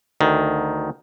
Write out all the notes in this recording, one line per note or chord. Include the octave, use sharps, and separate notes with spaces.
D2 D#3